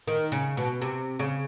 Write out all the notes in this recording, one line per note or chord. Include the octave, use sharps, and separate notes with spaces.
D#3
C#3
B2
C3
C#3